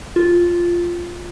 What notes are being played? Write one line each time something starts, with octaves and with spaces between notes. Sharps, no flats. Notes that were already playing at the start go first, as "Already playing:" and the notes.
F4